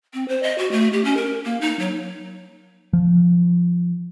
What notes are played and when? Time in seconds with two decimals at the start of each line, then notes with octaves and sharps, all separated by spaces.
0.14 C4
0.28 C5
0.43 D#5
0.58 F#4
0.72 A3
0.93 G4
1.05 C#4
1.17 A#4
1.45 A#3
1.61 D#4
1.79 F#3
2.93 F3